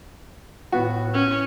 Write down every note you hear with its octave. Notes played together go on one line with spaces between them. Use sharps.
A2 B3 F#4
C#4